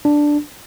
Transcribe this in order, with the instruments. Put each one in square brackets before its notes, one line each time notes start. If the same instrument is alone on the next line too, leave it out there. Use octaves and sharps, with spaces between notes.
[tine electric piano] D4